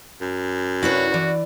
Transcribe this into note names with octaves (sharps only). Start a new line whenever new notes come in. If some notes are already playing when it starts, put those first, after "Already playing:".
F#2
C3 D4 E4 F#4 B4 C#5
E3 D5